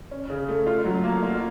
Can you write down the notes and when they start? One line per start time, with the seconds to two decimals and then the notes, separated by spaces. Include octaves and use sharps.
0.11 C#4
0.30 C#3
0.48 A3
0.67 F4
0.85 F#3
1.04 A#3
1.23 F4